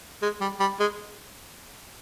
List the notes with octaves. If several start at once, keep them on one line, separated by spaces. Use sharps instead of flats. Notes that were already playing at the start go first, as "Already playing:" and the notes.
G#3
G3
G3
G#3